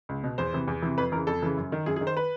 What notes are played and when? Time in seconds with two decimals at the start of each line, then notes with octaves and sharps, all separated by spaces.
0.09 C#2
0.24 B2
0.38 E2 C5
0.53 C3 E3
0.68 E2
0.82 C3 E3
0.98 F2 B4
1.12 E3 A#4
1.16 C#3
1.27 F2 A4
1.42 C#3 E3
1.57 F#2
1.72 D#3
1.86 F#2 G#4
1.96 G#4
2.01 D#3
2.07 C5
2.17 B4